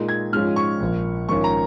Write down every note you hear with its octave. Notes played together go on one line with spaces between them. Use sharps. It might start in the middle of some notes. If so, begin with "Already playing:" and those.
Already playing: A#2 G#3 D#4
G#6
G#2 F3 G#3 C#4 F4 F6
C#6
A#1 A#2 F3
A#1 G#2 D#3 C#4 F4 C#6
A#5